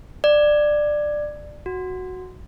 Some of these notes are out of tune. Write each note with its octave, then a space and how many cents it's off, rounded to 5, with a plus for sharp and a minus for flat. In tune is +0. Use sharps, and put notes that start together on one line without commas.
D5 +15
F#4 -5